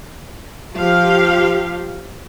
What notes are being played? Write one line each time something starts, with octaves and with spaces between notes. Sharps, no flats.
F3 G4 F5